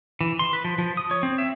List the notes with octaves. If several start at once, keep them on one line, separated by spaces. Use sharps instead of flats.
E3
C6
B4
F3
F3
D#6
C#5
C4
E5